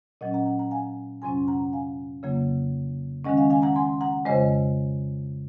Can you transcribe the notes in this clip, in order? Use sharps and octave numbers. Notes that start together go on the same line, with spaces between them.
A#2 F#3 C#4 D#5 F#5
F#5 A#5
F#5 A#5
F#5 A#5
F5 G#5
F2 C3 F#3 C#4 G#5 C6
F#5 A#5
F5 G#5
F2 C#3 F#3 A#3
D#3 G#3 C#4 D#5 F#5
F5 G#5
F5 G#5
F#5 A#5
G#5 C6
F#5 A#5
F2 C#3 G#3 C5 D#5